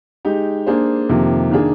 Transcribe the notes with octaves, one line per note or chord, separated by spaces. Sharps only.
G#3 D#4 G4
A#3 D4 G#4 C5
F2 C3 D#3 A#3
D#3 A#3 D4 G#4